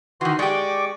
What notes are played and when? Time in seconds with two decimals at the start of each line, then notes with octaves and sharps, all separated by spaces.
0.21 D#3 E3 F#4 C6
0.39 G#3 G4 D5 C#6 D6